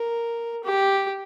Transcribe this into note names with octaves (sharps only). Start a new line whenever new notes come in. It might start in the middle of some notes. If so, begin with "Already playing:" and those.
Already playing: A#4
G4